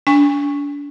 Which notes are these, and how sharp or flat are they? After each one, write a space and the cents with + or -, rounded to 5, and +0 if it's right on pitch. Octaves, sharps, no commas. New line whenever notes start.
D4 -35 G#5 -40 C#6 +0